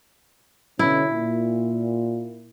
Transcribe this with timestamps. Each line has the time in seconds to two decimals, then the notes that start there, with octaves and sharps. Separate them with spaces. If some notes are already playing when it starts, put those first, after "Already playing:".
0.79 B2 D3 C#4 E4
1.11 A#2